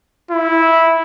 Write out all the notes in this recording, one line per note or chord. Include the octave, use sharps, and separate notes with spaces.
E4